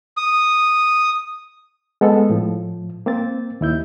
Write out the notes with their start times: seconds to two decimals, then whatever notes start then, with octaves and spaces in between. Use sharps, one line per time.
0.17 D#6
2.01 G#3 B3 A4
2.30 A2 F3
3.06 A#3 C4 A6
3.61 D#2 E4 G6